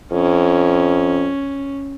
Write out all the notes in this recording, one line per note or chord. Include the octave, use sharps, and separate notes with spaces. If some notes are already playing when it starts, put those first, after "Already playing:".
F2 C#4